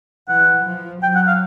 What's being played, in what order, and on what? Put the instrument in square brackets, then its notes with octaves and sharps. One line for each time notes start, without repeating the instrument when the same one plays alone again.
[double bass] E3 [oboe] F#5
[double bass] F3
[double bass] F#3 [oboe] G5
[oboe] F#5
F5